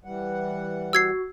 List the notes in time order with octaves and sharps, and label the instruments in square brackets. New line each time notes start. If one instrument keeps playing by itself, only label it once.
[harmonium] E3 G3 F#5
[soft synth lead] F#4 [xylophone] E6 G#6 C7